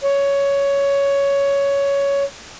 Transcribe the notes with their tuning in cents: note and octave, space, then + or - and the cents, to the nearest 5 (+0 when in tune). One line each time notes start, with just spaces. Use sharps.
C#5 +10